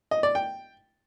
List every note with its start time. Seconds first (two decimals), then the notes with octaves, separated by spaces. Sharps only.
0.11 D#5
0.23 D5
0.35 G5